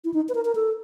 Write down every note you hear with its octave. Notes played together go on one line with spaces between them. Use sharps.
E4
D#4
B4
A#4
A#4
A4